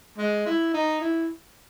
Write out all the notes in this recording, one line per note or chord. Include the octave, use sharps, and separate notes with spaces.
G#3
E4
D#4
E4